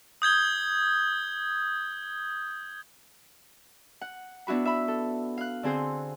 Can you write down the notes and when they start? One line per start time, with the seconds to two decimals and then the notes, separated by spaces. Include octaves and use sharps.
0.22 D#6 G6 G#6 G7
4.01 F#5
4.47 B3 D4 E4 F#4 B5
4.65 E5 B5
4.88 A4
5.38 F5 F#6
5.63 D3 C4 G#4 C5